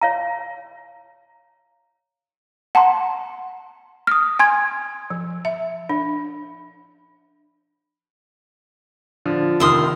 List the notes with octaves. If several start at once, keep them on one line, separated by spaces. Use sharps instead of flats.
C#5 F5 A#5
F#5 A5 A#5 C6
D#6 F6
G#5 C6 G#6
F3
E5
D4
D3 F3
F1 D#3 E5 C6 D#6 F6